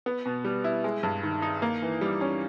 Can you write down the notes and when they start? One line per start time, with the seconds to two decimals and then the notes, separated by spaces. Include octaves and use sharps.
0.06 B3
0.26 B2
0.45 G3
0.64 E4
0.84 G#3
1.03 G2
1.23 D#3
1.42 D#4
1.62 A#3
1.82 E3
2.01 G3
2.21 C#4